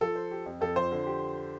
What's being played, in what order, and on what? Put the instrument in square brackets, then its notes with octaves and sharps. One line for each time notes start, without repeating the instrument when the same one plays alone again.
[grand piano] F3 [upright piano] A4
[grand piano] C5
G4
F2
[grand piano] F2 [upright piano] A4
[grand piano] F3 [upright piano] C5
[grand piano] D3
G4